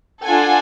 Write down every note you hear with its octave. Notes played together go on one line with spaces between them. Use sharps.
D4 F4 A4 F#5 G#5